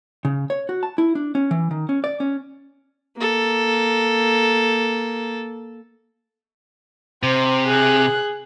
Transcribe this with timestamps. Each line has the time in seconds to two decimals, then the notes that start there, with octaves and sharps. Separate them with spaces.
0.25 C#3
0.50 C#5
0.69 F#4
0.83 A5
0.98 E4
1.15 D4
1.35 C#4
1.51 E3
1.71 D#3
1.89 C#4
2.04 D5
2.20 C#4
3.17 A#3 A4
7.23 C3 C5
7.66 G#4 F#6